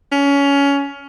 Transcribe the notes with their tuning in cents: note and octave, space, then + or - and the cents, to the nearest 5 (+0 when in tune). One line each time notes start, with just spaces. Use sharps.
C#4 +20